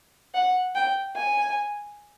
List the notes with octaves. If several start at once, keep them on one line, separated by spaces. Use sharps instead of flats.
F#5
G5
G#5